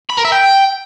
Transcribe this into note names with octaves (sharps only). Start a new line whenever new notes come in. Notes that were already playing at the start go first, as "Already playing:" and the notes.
B5
A#4
E5
G5